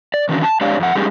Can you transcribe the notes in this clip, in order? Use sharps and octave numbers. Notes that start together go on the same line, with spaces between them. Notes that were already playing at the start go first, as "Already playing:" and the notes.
D5
D#3 E3 F#3 C#4 D4 F#4
A5
G#3 D4 G4 C#5 D5 F5
F2 F#5
G3 G#3 C#4 D#4 G4 G#4